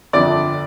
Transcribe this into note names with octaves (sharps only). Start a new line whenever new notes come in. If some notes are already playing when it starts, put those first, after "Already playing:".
G1 F2 D3 D5 D6